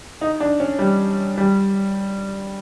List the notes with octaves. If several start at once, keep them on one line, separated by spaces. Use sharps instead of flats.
D#4
D4
C#4
G3
G3